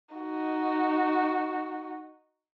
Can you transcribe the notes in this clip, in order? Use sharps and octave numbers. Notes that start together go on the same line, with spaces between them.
D#4 F#4